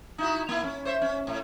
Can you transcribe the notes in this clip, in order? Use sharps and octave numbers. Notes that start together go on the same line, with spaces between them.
D#4 E4 F#4
A#3 E4
C#4
C5 C#5 E5
C#4
A2